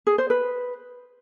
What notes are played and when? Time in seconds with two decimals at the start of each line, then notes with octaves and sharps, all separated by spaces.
0.07 G#4
0.18 C5
0.30 B4